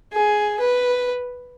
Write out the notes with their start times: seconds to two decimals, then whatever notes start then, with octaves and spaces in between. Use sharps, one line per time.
0.13 G#4
0.60 B4